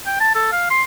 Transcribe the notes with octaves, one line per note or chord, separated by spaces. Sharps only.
G5
A5
A4
F5
C6